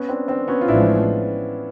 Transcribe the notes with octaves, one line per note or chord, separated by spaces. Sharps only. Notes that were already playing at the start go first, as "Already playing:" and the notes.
Already playing: B3 C#4
C4 D4
C4 D4
B3 C#4
F4
A1 A2 F3 G#3 D4 E4